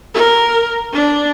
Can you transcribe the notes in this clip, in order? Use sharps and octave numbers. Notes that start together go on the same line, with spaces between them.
A#4
D4